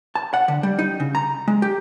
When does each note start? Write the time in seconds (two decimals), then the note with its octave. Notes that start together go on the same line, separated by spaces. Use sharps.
0.15 A5
0.34 F#5
0.48 D3
0.63 G3
0.79 D#4
1.00 C#3
1.15 A#5
1.48 G#3
1.62 G4